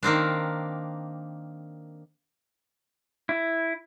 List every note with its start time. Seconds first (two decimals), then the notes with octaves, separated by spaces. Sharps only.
0.03 D#3 A#3 C4 D4
3.29 E4